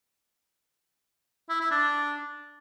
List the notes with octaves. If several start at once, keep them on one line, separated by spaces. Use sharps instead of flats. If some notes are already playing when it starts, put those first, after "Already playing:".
E4
E4
D4